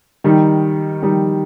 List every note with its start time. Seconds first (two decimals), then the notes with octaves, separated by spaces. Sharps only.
0.24 D#3 G3 D#4
1.02 D#3 G3 D#4